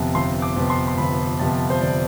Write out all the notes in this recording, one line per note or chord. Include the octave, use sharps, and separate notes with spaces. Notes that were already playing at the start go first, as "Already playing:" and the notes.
Already playing: G1 F2 C3 F3 B3
G1 C6
D6
F2 C3 F3 B3
C6
C6
G1 B5
F2 C3 F3 B3 A5
C5
G1 D5